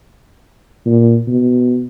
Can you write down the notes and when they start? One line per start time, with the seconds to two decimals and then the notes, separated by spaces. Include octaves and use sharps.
0.86 A#2
1.28 B2